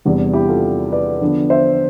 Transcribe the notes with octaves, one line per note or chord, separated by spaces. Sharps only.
E2 C3 G3 B3 D4
E4 G4
F4 A4
B4 D5
D3 F3 B3 D4
C5 E5